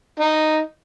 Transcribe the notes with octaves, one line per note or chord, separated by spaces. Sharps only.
D#4